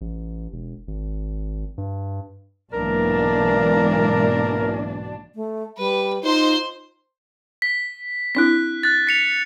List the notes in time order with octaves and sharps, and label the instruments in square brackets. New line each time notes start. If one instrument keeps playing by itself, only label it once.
[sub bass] A1
E1
G#1
G2
[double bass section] B1 E3 A#3 [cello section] G#2 B2 D4 [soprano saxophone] A#4
[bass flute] A3
[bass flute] G3 [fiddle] B4
[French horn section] D#4 [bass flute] F4 [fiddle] C5 C6
[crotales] B6
[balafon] C4 D4 E4 [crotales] F#6 B6
[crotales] F#6 A6
B6 C#7 F7